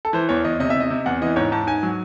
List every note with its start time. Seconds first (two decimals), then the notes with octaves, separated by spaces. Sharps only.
0.05 A4
0.13 E3 C5
0.29 E2 C#5
0.45 E2 D#5
0.60 C3 D#5
0.70 E5
0.75 C3
0.80 D#5
0.90 C3
1.06 E2 F#5
1.22 E3 D#5
1.36 G#2 C#5
1.52 G#2 A5
1.67 G#2 G#5
1.83 F#3